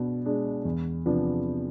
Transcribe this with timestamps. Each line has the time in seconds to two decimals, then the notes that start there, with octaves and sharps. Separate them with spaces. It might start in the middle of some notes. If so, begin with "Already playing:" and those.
Already playing: B2 D4
0.25 G#3 D4
0.65 E2
1.06 C3 F3 B3 D4